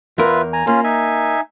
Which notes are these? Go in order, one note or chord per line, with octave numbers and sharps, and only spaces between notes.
E2 F4 A#4 B4 E5
G#5 A#5
A#3 C#4 F4
D#4 E5 G#5